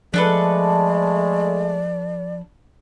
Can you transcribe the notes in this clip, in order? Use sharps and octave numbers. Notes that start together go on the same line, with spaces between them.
F3 G#3 A3 D4 A4 B4 D5